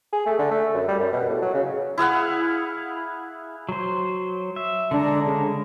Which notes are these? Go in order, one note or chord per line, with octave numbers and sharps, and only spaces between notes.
G#4
A3
D3
A3
F#2
G3
F#2
B2
A2
F#3
C#3
E4 G#4 F5 F#5
F#3 C5
E5
D3 G#3 D4 A#5
C#3